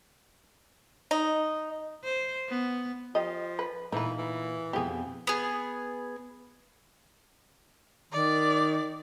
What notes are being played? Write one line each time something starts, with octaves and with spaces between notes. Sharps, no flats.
D#4
C5
B3
F3 G4 D#5
B4
A#2 E3 D#4 B4
E3
F2 B2 C4 G4 G#4
B3 G#4
D#3 D5